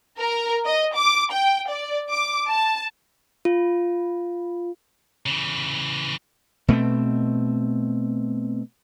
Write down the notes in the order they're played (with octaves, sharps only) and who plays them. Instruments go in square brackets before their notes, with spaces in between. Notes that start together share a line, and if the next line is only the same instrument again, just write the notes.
[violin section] A#4
D#5
D6
G5
D5
D6
A5
[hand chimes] F4
[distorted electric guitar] C#3 E3
[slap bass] B2 A3 A#3 C4